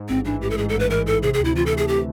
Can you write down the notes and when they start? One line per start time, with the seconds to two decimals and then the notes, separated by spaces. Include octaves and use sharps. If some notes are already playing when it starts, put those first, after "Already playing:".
Already playing: G#2
0.09 A1 C4
0.25 E3 D4
0.41 A1 G4
0.50 A4
0.58 G#2 G#4
0.69 A4
0.74 A1
0.80 B4
0.90 E3 A#4
1.07 A1 A4
1.22 C3 G#4
1.34 G#4
1.39 D2
1.45 E4
1.55 E3 F4
1.66 A4
1.71 A3
1.77 G#4
1.88 C3 G4